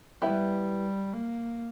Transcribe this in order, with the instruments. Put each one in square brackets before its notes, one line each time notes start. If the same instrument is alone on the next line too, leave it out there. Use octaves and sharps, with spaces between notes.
[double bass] G3 [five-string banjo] B3 E4 G4 B4 E5
[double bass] A#3